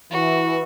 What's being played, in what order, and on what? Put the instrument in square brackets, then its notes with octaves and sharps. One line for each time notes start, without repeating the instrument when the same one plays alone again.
[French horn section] E3 [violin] F#4